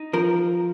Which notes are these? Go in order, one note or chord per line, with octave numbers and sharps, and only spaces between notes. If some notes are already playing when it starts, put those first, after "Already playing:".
Already playing: D#4
F3 A#4